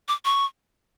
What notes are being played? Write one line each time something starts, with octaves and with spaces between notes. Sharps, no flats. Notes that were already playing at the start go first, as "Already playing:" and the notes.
D6
C#6